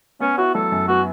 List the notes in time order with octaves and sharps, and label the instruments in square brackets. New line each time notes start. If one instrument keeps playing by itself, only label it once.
[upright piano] B3 [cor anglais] C#4
[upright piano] E4 [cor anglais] F#4
[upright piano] F#3 [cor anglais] A4
[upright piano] F#2
[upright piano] B3 [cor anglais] F#4